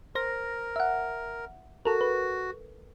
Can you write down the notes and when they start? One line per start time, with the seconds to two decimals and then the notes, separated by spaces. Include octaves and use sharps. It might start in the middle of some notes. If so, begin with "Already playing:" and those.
0.15 A#4 C5 A#6
0.76 E5 F#5
1.85 F#4 A4 A#4
2.01 B4